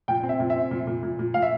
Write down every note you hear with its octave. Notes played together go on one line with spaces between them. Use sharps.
A#2 G5
C4
E5
A#2
E5
C4
A#2
A#2
A#2
A#2
A#2 F5
E5